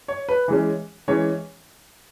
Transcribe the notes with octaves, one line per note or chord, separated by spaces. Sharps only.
C#5
B4
E3 G#3 C#4
E3 G#3 C#4 C#5